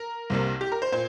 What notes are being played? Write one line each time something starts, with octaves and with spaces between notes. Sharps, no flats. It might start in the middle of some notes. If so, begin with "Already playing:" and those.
Already playing: A#4
C2 C3 G3 A#3
G4
A#4
C5
A#2 C5